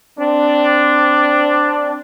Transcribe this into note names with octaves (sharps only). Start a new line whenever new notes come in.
C4 D4